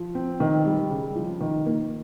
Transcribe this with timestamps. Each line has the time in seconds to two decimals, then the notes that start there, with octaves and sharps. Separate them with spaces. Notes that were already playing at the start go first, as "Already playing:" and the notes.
Already playing: F3
0.15 C4
0.40 D#3
0.65 G3
0.90 C#3
1.15 F3
1.41 D#3
1.66 A#3